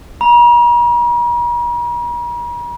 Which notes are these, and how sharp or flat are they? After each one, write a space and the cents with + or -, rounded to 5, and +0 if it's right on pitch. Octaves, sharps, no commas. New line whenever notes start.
A#5 +45